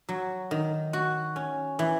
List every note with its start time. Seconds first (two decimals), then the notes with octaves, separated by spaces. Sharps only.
0.09 F#3
0.51 D#3
0.93 F#4
1.36 C#4
1.79 E3